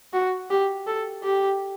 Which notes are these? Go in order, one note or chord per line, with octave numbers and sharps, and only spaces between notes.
F#4
G4
A4
G4